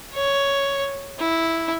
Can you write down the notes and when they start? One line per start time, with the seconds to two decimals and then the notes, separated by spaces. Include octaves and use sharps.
0.14 C#5
1.19 E4